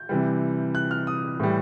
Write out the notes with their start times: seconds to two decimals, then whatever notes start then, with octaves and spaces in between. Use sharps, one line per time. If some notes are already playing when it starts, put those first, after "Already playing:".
Already playing: G6
0.09 C3 E3 G3
0.75 F#6
0.91 F6
1.07 D#6
1.40 A2 E3 G3